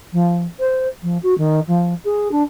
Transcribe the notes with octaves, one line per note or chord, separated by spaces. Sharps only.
F3
C5
F3
F#4
D#3
F3
G#4
D4